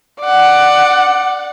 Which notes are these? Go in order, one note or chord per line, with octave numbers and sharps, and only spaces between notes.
D5 F#5